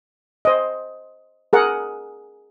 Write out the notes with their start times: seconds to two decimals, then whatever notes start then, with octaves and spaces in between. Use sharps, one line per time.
0.45 C5 D#5
1.53 G#4 A#4 F#5